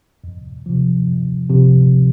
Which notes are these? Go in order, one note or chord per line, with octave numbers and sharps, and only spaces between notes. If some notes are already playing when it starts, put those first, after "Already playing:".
F2
C3 F3
F2
C3 F3